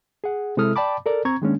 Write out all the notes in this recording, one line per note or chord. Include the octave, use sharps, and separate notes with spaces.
G#4 F#5
C3 G#3 E4 A4 D#6 F6
D5 G5 A5 B5 D6
A4 A#4 D5
C4 A#5 C#6 G#6
D#3 G#3 A#3 C#4 D4